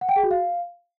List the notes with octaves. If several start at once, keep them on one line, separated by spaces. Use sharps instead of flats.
F#5
G5
G#4
F#4
F5